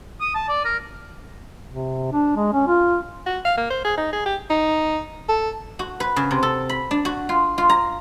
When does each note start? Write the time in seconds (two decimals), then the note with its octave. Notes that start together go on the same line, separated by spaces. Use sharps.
0.20 D#6
0.34 A5
0.48 D5
0.65 A#4
1.70 C3
2.13 D4
2.36 G#3
2.53 C#4
2.68 F4
3.26 F#4
3.45 F5
3.57 A#3
3.70 C5
3.85 G#4
3.98 D#4
4.13 G#4
4.26 G4
4.50 D#4
5.29 A4
5.79 F#4
6.00 B4
6.16 C#3
6.31 C3
6.43 A4
6.69 B5
6.91 D4
7.05 F#4
7.29 F4
7.58 F4
7.70 A#5